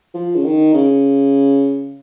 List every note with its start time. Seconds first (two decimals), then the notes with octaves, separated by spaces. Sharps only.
0.14 F3
0.36 C#3
0.45 D#3
0.74 C#3